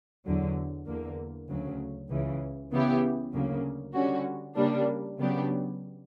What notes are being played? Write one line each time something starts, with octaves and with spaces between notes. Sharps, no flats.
E2 D3 F#3
E2 D3 A#3
D2 C#3 F#3
C#2 C#3 E3
C#3 E3 B3 E4 G4
D2 C#3 F#3 A#3
D3 G3 C#4 F#4
C#3 G3 A#3 D4
C#3 F#3 B3 D4 G4